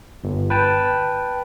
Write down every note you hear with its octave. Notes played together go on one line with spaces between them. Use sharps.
G1
B4 G5 A5